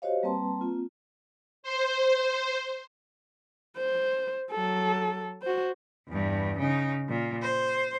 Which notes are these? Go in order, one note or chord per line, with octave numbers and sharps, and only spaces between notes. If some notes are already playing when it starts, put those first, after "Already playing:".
F#4 G4 C5 C#5 D#5 F5
G3 A#3 C4 B4 A5 C6
A#3 C4 F4
C5
C5
F#3 A4
F#4 C5
E2 G2
C#3 D#4
A#2
C5